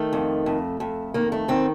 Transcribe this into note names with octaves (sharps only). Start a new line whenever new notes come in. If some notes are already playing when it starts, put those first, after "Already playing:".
Already playing: D#3 A3
F2
F2
F2
D#3 A#3
A3
D#3 C4